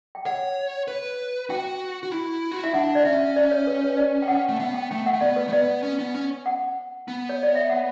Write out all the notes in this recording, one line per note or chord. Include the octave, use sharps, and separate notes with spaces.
G5
C#5 F#5
B4
F#4 G5
F#4
E4
F#4
E4 E5
D4 F#5
D5
C#4 E5
D5
C#5
B4
C#5
D5
G5
F#5
A3
B3 F#5
G5
A3 G5
F#5
A3
B3 D5
B4
A3
B3 D5
C#4
B3
C#4
F#5
B3
C#5
D5
E5
F#5